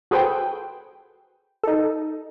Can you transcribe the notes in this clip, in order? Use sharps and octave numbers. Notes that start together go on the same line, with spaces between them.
F#4 G#4 A4 B4 C5 G5
D#4 A4